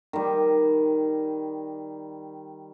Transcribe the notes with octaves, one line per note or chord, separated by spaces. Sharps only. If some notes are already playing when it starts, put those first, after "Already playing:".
D#3 G3